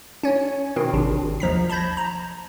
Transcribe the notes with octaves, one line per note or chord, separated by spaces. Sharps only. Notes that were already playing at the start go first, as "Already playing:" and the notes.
C#4 C#5
B2 D#3 C4
G#1 C3 D4
D#2 F3 A#5 B6
A5 B5 G6 G#6 A#6
A#5